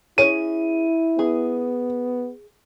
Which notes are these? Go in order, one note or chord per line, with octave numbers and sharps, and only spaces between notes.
C#4 E4 G#4 C#5 D#7
B3 G#4